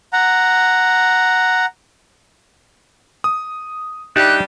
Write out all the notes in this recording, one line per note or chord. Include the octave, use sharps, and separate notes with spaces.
F#5 A#5
D#6
G3 D4 D#4 G4 D5 E5 F#6